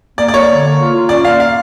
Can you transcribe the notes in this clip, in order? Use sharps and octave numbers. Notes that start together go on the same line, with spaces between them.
A#3 D5
D5
A#3 C#5
D3
A#3
F4
F4
C#4 D5
A#3 F5
F5